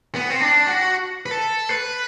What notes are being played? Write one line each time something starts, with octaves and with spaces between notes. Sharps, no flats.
B3
C4
D4
F#4
B4
A4
B4